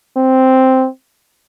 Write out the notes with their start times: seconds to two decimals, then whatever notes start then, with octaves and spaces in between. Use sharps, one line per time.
0.17 C4